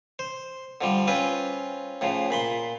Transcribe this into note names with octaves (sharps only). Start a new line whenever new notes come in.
C5
D3 F3 G3
C4 C#4 F4 B4
A2 C#3 F3
A#2 B5 C6